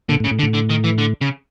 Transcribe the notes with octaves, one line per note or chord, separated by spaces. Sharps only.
A#2 D3
A2
C#3
A2
D3
A2
D3
D#3
E3
D3
C#3